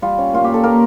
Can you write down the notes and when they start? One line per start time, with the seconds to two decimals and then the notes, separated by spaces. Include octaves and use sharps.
0.02 G3 F4
0.18 C#4
0.33 A#2 F4
0.44 A#2 G4
0.54 A4
0.63 A#3 G4 A#4